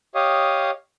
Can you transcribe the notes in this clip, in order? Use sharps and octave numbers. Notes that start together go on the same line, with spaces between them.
G4 C#5 D#5 F5 D#6